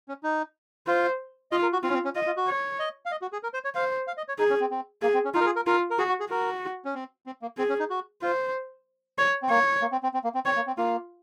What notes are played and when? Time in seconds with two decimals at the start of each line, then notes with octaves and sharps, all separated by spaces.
0.08 C#4
0.23 D#4
0.87 F4 C5
1.51 F4 D#5
1.62 A#4
1.73 F#4
1.83 C4 F4
1.89 C#4
1.94 C4
2.05 C#4
2.15 F4 D#5
2.26 F4
2.37 F#4
2.48 C#5
2.79 D#5
3.06 F5
3.11 D#5
3.22 F#4
3.33 G#4
3.43 A#4
3.54 C5
3.64 C#5
3.75 C5 F5
4.07 F5
4.17 D#5
4.28 C#5
4.38 D#4 G#4
4.50 C#4
4.61 C4
4.71 C4
5.02 A#3 G#4
5.14 C4
5.25 C#4
5.34 D#4 F4
5.41 A#4
5.46 G#4
5.56 A#4
5.67 F4 A#4
5.90 A#4
5.98 F#4 G#4
6.09 F#4
6.20 G#4
6.30 F#4 A#4
6.85 C#4
6.94 C4
7.26 C4
7.42 A#3
7.58 C4 G#4
7.69 C#4
7.79 D#4
7.90 F#4
8.22 F4 C5
9.18 C#5
9.43 C4
9.50 A#3 C#5
9.82 A#3
9.92 C4
10.03 C4
10.14 C4
10.24 A#3
10.35 C4
10.45 C4 C#5
10.56 A#3
10.67 C4
10.77 A#3 F4